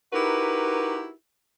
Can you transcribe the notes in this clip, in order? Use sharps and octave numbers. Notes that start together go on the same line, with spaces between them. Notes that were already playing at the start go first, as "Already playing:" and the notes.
D#4 E4 F#4 G4 A#4 B4